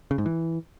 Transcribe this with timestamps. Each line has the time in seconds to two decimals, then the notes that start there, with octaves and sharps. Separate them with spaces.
0.11 C#3
0.18 G#2
0.26 E3